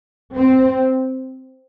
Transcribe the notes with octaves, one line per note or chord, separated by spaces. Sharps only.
C4